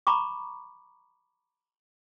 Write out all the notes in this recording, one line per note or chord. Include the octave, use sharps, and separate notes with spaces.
A#5 B5 C#6 D6